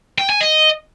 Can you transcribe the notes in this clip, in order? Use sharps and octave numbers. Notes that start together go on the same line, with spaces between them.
G5
G#5
D#5